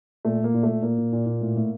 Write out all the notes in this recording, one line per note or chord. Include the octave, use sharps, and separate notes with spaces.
A#2 A3
A#2 A#3
A#2
A3
A#2
A#2 A#3
A#2
A#2
A#2
A2
A2